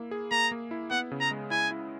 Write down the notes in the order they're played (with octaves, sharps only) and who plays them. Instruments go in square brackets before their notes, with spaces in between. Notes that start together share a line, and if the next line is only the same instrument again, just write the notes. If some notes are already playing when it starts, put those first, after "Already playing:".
Already playing: [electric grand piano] A#3 E4
G#4
[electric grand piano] A#3 [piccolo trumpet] A#5
[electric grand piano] A#3
E4
[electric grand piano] B3 [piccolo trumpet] F#5
[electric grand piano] C#3
[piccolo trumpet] A#5
[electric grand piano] G#3
[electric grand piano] E4 [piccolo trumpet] G#5
[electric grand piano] E4